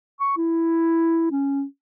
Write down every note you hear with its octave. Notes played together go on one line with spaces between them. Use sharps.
C#6
E4
C#4